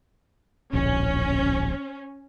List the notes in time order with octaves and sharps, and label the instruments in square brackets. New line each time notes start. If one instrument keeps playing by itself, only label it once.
[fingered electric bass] D1 A#1 [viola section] C#4